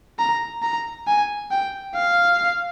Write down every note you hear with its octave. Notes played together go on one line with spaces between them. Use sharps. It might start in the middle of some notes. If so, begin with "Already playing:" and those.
A#5
A#5
G#5
G5
F5